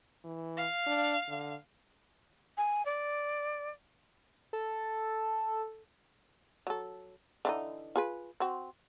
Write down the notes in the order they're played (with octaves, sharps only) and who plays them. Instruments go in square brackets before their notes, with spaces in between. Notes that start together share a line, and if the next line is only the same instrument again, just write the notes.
[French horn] E3
[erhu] F5
[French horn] D4
D3
[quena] G#5
D5
[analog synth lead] A4
[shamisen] F#3 A4
D3 E3 D#4
F4 G#4 B4
C4 F#4